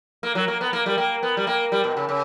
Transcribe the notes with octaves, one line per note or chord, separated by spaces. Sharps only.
A#3
F#3
A#3
B3
A#3
G3
A#3
B3
G3
A#3
G3
B2
C#3
C#3